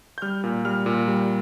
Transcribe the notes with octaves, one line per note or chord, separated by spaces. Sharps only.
G6
G3 F6
A#2
G3 F6
A#2
G3